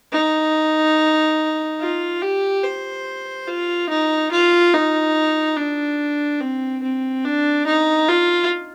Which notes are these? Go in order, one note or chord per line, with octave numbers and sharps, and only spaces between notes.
D#4
F4
G4
C5
F4
D#4
F4
D#4
D4
C4
C4
D4
D#4
F4